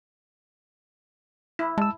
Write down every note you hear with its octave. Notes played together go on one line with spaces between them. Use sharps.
E4
G#3 A5 E6